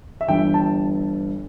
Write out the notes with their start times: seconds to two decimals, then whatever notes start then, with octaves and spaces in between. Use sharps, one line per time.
0.21 E5
0.28 G1 G2 E3 G5
0.54 A5